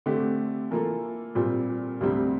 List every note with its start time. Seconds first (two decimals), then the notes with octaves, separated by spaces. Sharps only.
0.06 D3 A3 C4 G4
0.71 E3 A#3 F4 A4
1.35 A#2 G3 C4 F4
2.01 D2 C3 G3 C4